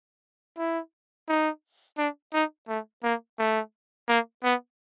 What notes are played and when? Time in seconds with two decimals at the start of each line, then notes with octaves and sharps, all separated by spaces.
0.58 E4
1.28 D#4
1.98 D4
2.34 D#4
2.68 A3
3.04 A#3
3.39 A3
4.08 A#3
4.44 B3